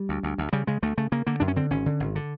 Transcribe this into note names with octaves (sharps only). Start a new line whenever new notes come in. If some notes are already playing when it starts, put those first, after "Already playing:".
Already playing: G3
D2
D2
D2
C#3 G3
C#3 G#3
D2 A3
C#3 A3
C#3 A#3
D3 A#3
F#2 D4
C#4
D3 C4
G#1 C#4
D3
G#1
D3